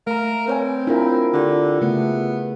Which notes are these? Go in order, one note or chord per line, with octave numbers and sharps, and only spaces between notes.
A3 A#4 F5 A#5
C4 B4 C#5 G#5
D4 E4 F4 A#4 F5
D3 F4 G4
C#3 A3 B3